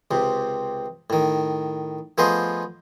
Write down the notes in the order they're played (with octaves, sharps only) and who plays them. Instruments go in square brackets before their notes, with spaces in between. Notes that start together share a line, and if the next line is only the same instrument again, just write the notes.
[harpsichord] C#2 C3
A2 D#3
F3 A3 B3 G#4 C5 D#5